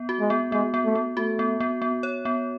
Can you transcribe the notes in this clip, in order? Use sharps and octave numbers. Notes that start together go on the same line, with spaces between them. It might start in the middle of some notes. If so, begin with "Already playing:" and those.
Already playing: B3
F#4
G#3
B3
G#3 B3
B3
A3
B3
A3 F#4
B3
B3
B3
C#5
B3